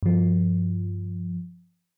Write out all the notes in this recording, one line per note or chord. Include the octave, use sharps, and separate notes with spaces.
G2 F3